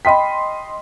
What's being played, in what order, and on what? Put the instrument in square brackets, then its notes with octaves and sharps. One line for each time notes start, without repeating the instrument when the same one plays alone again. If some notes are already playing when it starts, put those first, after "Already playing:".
[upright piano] D#5 C6 B6 [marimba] G5 B5